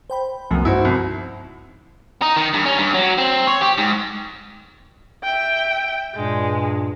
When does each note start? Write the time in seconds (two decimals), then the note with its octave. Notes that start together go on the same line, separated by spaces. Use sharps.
0.10 C5 G5 B5
0.51 C2 F#2 F3 A3 B3
0.65 G2 D#4 E4 F#4 C5
0.85 C2
2.22 D#4
2.36 D#3
2.53 G2
2.65 C#4
2.78 G2
2.94 F#3
3.18 C4
3.47 C#5
3.61 G4
3.78 G#2
5.24 E5 G5
6.15 G2 A#2 G#3